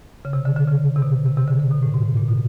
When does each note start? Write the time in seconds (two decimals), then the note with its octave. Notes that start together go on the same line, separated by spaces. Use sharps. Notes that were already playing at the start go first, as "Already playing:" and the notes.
0.25 C#3
0.33 C3
0.45 D3
0.56 D3
0.68 C#3
0.96 C3
1.02 B2
1.26 C3
1.37 C3
1.48 D3
1.60 D3
1.71 B2
1.83 A2
1.94 G#2
2.05 A2
2.17 A#2
2.28 B2